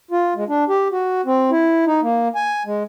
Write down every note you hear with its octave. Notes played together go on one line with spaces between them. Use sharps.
F4
G#3
D4
G4
F#4
C4
E4
D#4
A#3
G#5
G#3